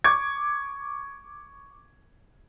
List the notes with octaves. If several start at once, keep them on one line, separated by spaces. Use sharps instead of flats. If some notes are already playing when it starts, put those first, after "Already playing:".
C#6 D6 G#6